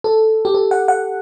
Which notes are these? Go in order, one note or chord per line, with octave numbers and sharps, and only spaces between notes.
A4
G4
A4
F#5
F#5